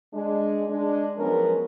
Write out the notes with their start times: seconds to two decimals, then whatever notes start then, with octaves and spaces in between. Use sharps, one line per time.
0.13 G#3 D4
0.69 G#3 D4
1.18 F3 F#3 G#3 B3 C#4 A#4